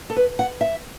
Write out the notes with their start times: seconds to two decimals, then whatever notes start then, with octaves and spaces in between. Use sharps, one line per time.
0.10 A4
0.16 B4
0.39 F#5
0.61 E5